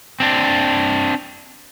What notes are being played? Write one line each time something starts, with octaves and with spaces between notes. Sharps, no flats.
C4 D4